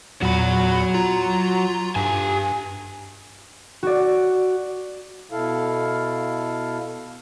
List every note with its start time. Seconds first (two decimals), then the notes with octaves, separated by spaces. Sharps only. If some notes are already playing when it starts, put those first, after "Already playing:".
0.22 E2 A#2 F#3 F#4 B5
0.94 F4 A#5
1.96 G2 G4 G#5
3.83 F#4 D5
5.32 B2 E4 A4 F5